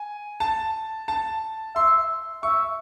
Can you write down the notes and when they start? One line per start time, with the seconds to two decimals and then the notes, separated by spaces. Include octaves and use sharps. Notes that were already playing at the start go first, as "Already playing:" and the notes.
Already playing: G#5
0.40 A5
1.08 A5
1.75 E5 C6
2.43 E5 C#6